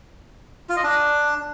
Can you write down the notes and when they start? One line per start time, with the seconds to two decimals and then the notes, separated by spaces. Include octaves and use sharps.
0.69 F4
0.76 D#5
0.83 D4